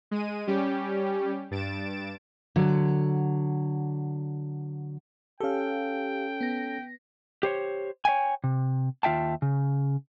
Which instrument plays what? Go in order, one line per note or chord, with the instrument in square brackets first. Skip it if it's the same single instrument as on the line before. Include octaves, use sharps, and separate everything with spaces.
[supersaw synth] G#3 D#7
G3 C#4 G4
G2 A6 D7 E7
[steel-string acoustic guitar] D3 F#3
[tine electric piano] C#4 A4 [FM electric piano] G4 F5 [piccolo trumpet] G5
[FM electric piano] B3 A#6
[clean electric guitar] G4 C5 C#5
C#5 E5 G5 G#5
C3
D#2 F4 E5 G5 A5
C#3